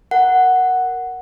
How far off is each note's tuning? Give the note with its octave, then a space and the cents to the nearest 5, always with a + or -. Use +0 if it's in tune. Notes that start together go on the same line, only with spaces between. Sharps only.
A#4 +0 F#5 +0